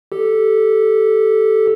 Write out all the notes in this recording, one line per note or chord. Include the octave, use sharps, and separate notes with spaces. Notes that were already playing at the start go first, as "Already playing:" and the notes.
G4 A4